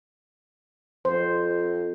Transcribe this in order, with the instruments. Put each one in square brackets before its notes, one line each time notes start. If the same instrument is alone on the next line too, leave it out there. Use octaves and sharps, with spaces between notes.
[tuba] F2 [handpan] C5